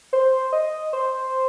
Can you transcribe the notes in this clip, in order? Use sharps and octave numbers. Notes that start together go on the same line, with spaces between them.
C5
D#5
C5